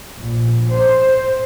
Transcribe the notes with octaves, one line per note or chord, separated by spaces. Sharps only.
A#1
C5